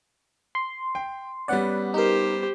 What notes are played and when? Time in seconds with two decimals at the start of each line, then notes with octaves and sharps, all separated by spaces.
0.55 C6
0.95 G5
1.48 G3 B3 C#4 D5 F#5
1.94 D#4 G4 A#4 C5